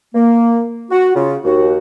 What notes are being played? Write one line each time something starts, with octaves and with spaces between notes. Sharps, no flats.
A#3
F#4
C#3 F4
D#2 F#4